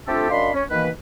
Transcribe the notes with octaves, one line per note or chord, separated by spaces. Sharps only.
A3 C4 D4 F4 G4 A4
F#2 D4 D#5 F5 B5 C6
C#4
B2 D#3 E3 A#3 B4